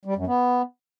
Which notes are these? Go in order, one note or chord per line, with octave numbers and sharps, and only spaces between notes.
G3
F#2
B3